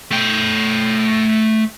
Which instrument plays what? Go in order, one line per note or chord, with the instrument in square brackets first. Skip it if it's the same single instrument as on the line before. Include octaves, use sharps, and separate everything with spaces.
[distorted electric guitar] A3 G5